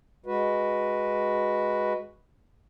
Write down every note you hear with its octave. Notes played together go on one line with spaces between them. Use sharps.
G#3 F#4 B4